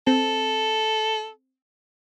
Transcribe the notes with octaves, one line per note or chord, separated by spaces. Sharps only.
C4 A4